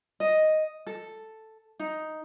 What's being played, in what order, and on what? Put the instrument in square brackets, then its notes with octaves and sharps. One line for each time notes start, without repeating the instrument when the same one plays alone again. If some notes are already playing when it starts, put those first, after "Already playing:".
[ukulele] D#5
A4
D#4